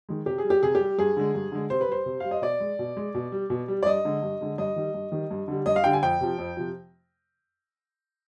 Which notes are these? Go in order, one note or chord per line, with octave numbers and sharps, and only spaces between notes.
D#3 G#3
C3 G4
G#4
G3
G4
C3 G#4
G4
G3
G2 G#4
D3 G#3
G2
D3 G#3
C3 C5
B4
G3 C5
C3
G3 F5
D#5
B2 D5
G#3
B2
G#3
B2
G3
B2
G3
D5
G2 D#5
D3 G#3
G2
D3 G#3
G2 D#5
D#3 G3
G2
D#3 G3
G2
D3 G3
G2 D#5
F5
D3 G3 G5
G#5
F2 G5
C3 F3
F2
C3 F3